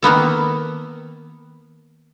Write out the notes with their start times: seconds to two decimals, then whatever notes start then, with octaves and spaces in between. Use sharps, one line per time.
0.02 D#3 A#3 B3 A4